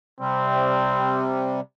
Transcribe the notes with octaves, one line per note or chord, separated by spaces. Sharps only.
C3 G3 C4